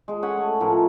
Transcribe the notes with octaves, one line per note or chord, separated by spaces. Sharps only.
G#3 G#4
C#4 F#5 G#5 B5
A3
A2 F3 A#4 B4